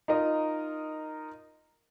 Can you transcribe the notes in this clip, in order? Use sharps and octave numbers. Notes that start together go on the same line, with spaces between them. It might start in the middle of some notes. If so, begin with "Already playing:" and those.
D#4 F4 A#4 D#5